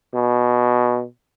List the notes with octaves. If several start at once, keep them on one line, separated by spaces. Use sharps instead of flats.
B2